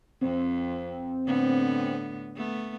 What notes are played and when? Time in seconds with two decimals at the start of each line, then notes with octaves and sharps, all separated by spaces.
0.21 F2 C4
1.26 A2 D3 B3
2.36 A3 B3